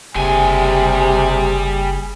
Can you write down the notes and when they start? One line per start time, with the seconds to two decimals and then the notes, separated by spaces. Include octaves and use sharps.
0.15 F#1 C3 G3 G#4 G#5